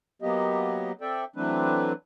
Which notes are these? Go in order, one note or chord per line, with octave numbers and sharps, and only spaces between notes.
F#3 A#3 B3 G4 D#5
C4 A4 D5 E5 G5
E3 F#3 A3 C4 D4 B4